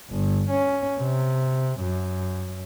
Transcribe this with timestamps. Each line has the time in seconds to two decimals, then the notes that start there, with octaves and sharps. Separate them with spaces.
0.10 G1
0.50 C#4
0.99 C3
1.81 F#2